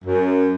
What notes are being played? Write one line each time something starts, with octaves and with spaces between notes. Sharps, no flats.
F#2